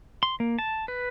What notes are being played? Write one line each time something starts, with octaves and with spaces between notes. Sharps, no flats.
C6
A#3
A5
B4